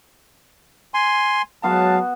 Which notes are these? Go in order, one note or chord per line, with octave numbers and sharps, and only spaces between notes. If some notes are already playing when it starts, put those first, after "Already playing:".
G#5 C6
F#3 G#3 B3 F#4 F5 A5